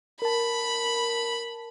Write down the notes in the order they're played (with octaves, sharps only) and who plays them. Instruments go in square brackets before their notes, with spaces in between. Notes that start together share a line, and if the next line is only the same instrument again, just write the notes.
[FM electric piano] A#4 A5 [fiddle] B5